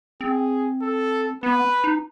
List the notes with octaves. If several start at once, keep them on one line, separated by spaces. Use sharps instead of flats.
C4 G#4
A4
B3 B4
D#4